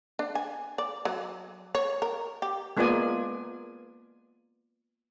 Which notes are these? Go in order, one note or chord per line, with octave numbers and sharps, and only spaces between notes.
D4
G#5
D5
F#3
C#5
A#4
G4
G#3 A#3 B3 F4 D5 G#5